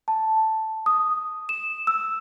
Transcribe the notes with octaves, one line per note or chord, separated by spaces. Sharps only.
A5
D#6
E7
E6